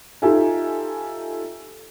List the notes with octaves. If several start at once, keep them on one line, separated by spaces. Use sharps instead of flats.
D#4 F4 G4 A4 E5 G#5